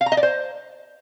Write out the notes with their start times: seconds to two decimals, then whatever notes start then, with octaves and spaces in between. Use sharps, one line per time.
0.01 F5
0.06 A#5
0.12 D#5
0.17 D5
0.23 C5